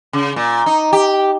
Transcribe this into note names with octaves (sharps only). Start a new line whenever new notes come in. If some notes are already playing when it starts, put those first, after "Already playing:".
C#3
A#2
D#4
G4